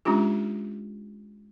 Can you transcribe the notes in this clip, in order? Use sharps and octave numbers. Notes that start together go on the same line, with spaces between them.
G#3 C#4 D4 F4 G4